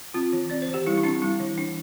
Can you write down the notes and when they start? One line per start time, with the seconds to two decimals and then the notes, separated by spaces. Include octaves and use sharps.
0.14 C4 F4
0.33 E3
0.50 C4 D5
0.62 C5
0.68 E3
0.74 G4
0.87 G3 E4
0.98 E4
1.04 C4 D4
1.22 G3 E4
1.40 E3
1.57 E3 D4